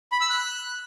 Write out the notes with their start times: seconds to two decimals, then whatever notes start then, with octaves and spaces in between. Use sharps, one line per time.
0.12 B5
0.21 E6
0.30 F#6